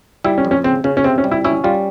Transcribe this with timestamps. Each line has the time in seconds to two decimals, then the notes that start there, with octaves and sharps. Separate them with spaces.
0.24 G3 E4
0.38 C#4
0.45 F2
0.51 C#4
0.64 C#3 C4
0.84 C#3 C#4
0.97 C#4
1.04 C3 C4
1.18 C#4
1.24 G3
1.31 E4
1.44 C#4 E4
1.64 G3 F4